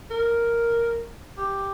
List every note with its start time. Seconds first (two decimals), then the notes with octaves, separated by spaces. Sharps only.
0.11 A#4
1.38 G4